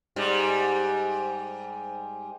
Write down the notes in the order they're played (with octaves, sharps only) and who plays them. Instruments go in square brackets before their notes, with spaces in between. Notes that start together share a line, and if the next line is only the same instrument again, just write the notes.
[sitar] G#2 G3